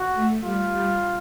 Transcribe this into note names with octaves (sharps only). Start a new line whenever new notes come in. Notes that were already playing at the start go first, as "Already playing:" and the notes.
Already playing: F#4
A3
G3 F4
G3